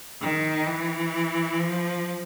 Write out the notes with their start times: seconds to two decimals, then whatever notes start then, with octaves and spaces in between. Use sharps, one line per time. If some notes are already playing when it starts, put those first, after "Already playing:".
0.22 D#3
0.67 E3
1.59 F3